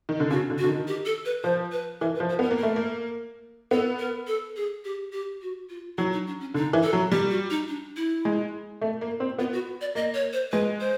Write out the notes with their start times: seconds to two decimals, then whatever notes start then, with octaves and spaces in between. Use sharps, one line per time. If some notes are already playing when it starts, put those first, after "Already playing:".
0.09 D#3
0.20 D3
0.31 C#3 F#4
0.50 D3
0.58 F#4
0.64 D3
0.69 D#3
0.88 G4
1.06 A4
1.25 B4
1.43 F3 C5
1.72 B4
2.01 E3 A#4
2.14 B4
2.20 F3
2.29 C5
2.39 B3 A#4
2.51 A#3
2.58 A#4
2.63 A3
2.76 A#3
3.71 B3 A4
3.99 A#4
4.27 A4
4.56 G#4
4.85 G4
5.13 G4
5.42 F#4
5.70 F4
5.98 F#3 E4
6.13 D#4
6.27 D4
6.41 C#4
6.54 D3 D#4
6.73 E3
6.83 A4
6.93 F#3
7.12 G3 G4
7.30 F#4
7.50 D#4
7.68 D4
7.96 E4
8.25 G#3
8.81 A3
9.01 A#3
9.20 C4
9.39 B3 F4
9.53 F#4
9.81 D5
9.95 A#3 D#5
10.14 C#5
10.33 C5
10.52 G#3 B4
10.80 C5